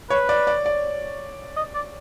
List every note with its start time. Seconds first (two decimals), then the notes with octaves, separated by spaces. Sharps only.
0.10 B4 C#5
0.29 D5
0.47 D5
0.66 D5
1.57 D#5
1.75 D5